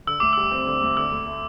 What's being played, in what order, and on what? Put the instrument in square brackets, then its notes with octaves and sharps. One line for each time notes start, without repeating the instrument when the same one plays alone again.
[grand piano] D3 [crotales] E6
[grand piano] D2 [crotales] D6
[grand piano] G3 [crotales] E6
[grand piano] C4
D3
D2
[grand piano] D3 [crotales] E6
[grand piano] D2
A3